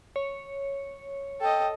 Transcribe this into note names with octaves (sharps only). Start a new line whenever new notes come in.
C#5
A4 D#5 G5